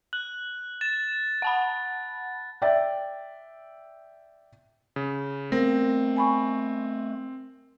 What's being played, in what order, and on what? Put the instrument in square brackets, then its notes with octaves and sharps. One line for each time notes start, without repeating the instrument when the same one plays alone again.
[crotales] F#6 [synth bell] F#7
[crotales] A6 [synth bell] E7
[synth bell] F#5 A5 B5
[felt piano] D5 E5 G5 A6
[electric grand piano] C#3
[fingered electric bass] A3 B3 [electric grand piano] C4 [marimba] A#4
[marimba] G#5 B5 C#6